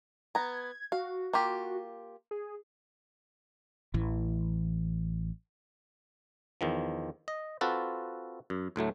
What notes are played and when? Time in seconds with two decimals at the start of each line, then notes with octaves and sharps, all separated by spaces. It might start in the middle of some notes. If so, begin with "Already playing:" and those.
0.35 B3 A#5 G#6
0.92 F#4 F5
1.33 A#3 F4 G4
2.31 G#4
3.94 A1 E3
6.61 E2 D#3 F3
7.28 D#5
7.61 C4 F4 F#4 A4 B4
8.50 F#2
8.76 D2 A2 F#3 A3